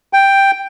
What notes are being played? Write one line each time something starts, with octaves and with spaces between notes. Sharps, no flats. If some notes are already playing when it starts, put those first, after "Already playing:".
G5